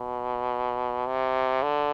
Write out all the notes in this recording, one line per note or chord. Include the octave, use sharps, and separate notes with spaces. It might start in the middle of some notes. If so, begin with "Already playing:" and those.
Already playing: B2
C3
D3